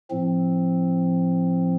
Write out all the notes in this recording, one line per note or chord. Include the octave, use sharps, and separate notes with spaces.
A2 F3 C4